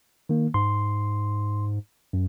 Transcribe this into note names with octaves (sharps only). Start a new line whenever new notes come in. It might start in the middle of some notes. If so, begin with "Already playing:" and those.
D#3 A#3
G#2 C6
F#2